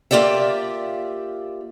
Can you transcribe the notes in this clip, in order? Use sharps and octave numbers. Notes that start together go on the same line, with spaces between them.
A#3 F4 G4 D5 E5